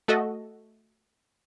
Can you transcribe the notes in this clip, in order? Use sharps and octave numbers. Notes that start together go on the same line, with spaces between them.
A3 F#4 A4 D#5